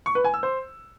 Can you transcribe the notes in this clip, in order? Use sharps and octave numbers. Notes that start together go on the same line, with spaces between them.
C#6
B4
G#5
E6
C5